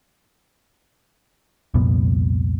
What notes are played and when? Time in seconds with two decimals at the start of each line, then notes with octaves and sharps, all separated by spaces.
1.74 C2 F2 A#2 B3